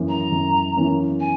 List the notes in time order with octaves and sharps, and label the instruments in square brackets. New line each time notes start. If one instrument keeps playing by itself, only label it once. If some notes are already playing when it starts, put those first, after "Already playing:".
Already playing: [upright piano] F#2 E3 A#3 C#4
[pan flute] A#5
[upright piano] F#2
E3 A#3 C#4
[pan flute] G#5